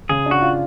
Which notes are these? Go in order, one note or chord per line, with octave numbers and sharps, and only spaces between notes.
C#3 G#4
D4
F#4
F4